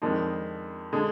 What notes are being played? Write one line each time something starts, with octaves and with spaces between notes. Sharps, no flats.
F2 D#3 G#3 D4
D3 G#3 D4 G#4